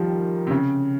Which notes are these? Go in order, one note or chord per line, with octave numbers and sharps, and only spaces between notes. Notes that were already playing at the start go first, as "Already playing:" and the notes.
Already playing: D#3 F3 G3
C3
C#3